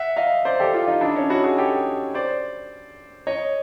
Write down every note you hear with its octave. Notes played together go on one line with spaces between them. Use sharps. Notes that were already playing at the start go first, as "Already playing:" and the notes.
Already playing: E5 F#5
D#5 F5
C5 D5
G4 A4
F4 G4
D#4 F4
D4 E4
C#4 D#4
E4 F#4
F#4 G#4
G4 A4
C5 D5
C#5 D#5